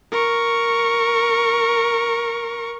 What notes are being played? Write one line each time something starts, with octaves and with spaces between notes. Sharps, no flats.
A#4 C#6